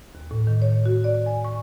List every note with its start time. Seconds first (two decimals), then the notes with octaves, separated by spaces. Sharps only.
0.15 D#2
0.31 A2
0.47 D#3
0.62 C#5
0.86 F#4
1.04 D5
1.26 G#5
1.44 C#6